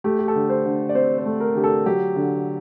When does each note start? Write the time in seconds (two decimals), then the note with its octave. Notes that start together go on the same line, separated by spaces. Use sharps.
0.04 A3 G4
0.19 G4
0.28 A4
0.35 D3
0.50 C5
0.66 D3
0.89 D5
0.95 C4 C5
1.18 C5
1.26 A3
1.40 A#4
1.55 D3 G4
1.64 A4
1.86 F#3 G4
2.16 D3